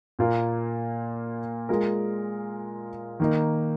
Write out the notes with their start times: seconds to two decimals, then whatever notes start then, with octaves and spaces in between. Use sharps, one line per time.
0.19 A#2 A#3 F4 A#4
1.69 G#3 F4 A#4
3.20 D#3 A#3 D#4